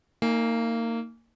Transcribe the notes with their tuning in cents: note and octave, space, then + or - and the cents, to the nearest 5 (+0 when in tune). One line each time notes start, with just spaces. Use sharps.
A#3 -25 D#4 +15 G#5 +0